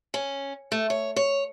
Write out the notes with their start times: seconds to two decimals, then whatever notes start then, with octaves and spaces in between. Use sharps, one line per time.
0.14 C#4
0.72 A3
0.90 C#5
1.16 C#5